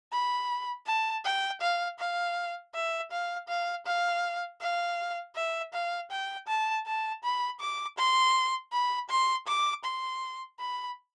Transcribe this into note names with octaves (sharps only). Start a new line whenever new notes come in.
B5
A5
G5
F5
F5
E5
F5
F5
F5
F5
E5
F5
G5
A5
A5
B5
D6
C6
B5
C6
D6
C6
B5